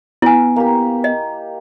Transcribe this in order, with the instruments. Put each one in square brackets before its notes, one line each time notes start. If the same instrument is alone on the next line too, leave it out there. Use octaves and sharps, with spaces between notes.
[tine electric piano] B3 [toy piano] E4 G#5
[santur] A#3 G4
[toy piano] D#5